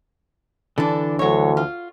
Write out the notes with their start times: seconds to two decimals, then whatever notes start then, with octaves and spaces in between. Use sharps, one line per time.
0.78 D3 E3 D4 A4
1.19 D2 F#3 C#5
1.57 F4